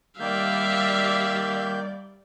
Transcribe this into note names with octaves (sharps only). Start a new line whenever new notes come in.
D#3 G3 A#3 D5 E5 F5 G6